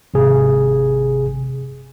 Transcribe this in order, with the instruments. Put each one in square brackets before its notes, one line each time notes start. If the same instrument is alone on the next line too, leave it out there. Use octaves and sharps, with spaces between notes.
[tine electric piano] G#1 C3 G#4